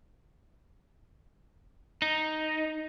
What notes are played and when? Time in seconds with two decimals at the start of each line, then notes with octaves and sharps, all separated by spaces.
2.02 D#4